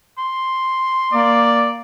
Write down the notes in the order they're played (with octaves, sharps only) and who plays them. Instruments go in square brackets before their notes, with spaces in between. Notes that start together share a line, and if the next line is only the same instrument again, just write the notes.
[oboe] C6
[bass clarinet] A#3 [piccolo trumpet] D5